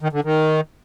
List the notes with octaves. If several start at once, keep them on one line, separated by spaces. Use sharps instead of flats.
D#3
D3
D#3